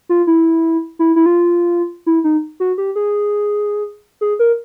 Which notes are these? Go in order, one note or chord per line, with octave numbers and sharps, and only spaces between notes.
F4
E4
E4
E4
F4
E4
D#4
F#4
G4
G#4
G#4
A#4